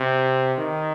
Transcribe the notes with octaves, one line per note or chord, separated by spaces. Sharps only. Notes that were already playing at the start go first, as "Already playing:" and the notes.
Already playing: C3
D#3